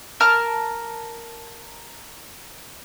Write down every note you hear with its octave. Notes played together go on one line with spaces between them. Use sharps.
A#4 A5 F6